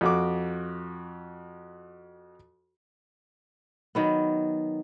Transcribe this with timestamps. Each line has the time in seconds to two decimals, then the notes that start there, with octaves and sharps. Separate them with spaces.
0.01 F2 F#4 D6
3.95 D#3 F#3 B3